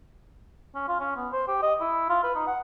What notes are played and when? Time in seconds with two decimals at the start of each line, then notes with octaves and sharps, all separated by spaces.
0.75 C#4
0.88 F4
1.00 C#4
1.16 B3
1.32 C5
1.48 G4
1.62 D#5
1.81 E4
2.10 F4
2.24 B4
2.35 D#4
2.47 F#5